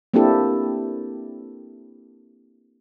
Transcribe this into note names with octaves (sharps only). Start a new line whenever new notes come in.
A#3 C4 D4 E4 G4 A4